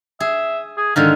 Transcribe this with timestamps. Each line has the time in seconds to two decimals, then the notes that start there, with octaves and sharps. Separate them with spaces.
0.20 G#4 E5
0.78 G#4
0.96 G#2 D3 D#3 F5